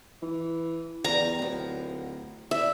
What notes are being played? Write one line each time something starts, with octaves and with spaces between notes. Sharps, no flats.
E3
E2 G3 F4 G4 A#5
D1 F3 B3
B2 A3 D5 E5